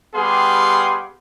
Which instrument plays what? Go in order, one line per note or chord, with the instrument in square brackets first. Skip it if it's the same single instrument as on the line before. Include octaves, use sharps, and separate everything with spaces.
[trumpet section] G3 B3 G4 G#4 F5 C6